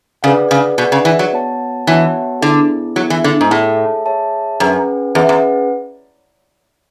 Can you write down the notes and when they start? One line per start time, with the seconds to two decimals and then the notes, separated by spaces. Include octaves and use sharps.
0.23 C#3 G#4 B4 D5 F#5
0.51 C#3
0.78 B2 G#4 B4 D5 F#5
0.92 C#3
1.05 E3
1.19 F#3
1.33 B3 F#4 C#5 F#5 A5
1.87 E3 B3 F#4 C#5 F#5 A5
2.41 D3 B3 E4 G#4
2.96 F#3 B3 E4 G#4
3.10 E3
3.24 D3
3.41 G#2
3.51 A2 G#4 C#5 E5 A5
4.06 G#4 C#5 E5 A5
4.60 F#2 C#4 G#4 B4 F#5
5.15 E2 C#4 G#4 B4 F#5
5.29 E2